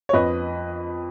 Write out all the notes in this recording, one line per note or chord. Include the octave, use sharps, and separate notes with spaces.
C#5
F2 B4 D#5